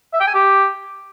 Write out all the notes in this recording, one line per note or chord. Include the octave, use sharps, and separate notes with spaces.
E5
G5
G#5
G4